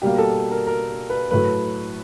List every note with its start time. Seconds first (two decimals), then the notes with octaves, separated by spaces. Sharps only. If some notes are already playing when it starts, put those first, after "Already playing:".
0.02 B2 G3 A#3 G4
0.18 A4
0.51 A#4
0.67 A#4
1.10 B4
1.30 A2 F#3 A3 B4